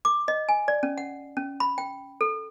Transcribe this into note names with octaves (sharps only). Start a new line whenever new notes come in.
D6
D#5
G#5
D5
C#4
F#5
C#4
B5
G5
A4